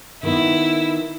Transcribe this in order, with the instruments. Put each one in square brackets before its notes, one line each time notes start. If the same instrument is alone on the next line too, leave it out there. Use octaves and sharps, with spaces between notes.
[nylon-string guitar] D#3 B3 [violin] E4